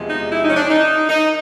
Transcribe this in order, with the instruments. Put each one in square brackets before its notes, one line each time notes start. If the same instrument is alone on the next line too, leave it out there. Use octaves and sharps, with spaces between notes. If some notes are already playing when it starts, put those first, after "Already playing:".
Already playing: [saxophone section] E2 C3 F3 G#3
D#4
E4
D#4
C#4
D4
D#4
D#4